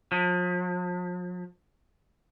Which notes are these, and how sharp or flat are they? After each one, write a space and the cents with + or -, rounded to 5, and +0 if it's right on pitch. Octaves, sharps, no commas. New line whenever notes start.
F3 +40